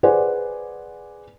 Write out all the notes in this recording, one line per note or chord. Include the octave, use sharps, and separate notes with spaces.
G#4 B4 C5 D5 F#5 G#5